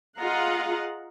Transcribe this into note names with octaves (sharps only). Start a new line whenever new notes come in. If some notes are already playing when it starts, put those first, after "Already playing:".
F4 G#4 D#5 F5 F#5 A#5